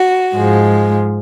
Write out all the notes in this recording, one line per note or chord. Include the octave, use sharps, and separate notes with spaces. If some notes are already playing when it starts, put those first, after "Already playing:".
Already playing: F#4
G#2 F3 G#3